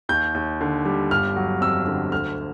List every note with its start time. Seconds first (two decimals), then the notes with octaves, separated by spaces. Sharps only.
0.09 D#2 G6
0.35 D#2
0.61 D3
0.85 G3
1.11 G1 F6
1.36 F#3
1.61 F2 E6
1.87 D3
2.12 D2 F6